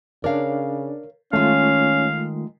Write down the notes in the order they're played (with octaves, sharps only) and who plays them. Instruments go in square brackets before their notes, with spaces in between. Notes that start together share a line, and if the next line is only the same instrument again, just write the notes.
[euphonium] C#3 [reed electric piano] D4 D5 [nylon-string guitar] A#4 C#5 F5
[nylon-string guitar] D#3 G#3 [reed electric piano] A3 F4 [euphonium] C#4 [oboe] F5